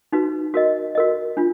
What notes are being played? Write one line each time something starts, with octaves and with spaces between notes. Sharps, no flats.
D#4 F#4 B4
F#4 A#4 D#5
F#4 A#4 D#5
D4 F4